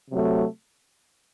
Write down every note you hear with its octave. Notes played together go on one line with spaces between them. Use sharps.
C3 F#3 A3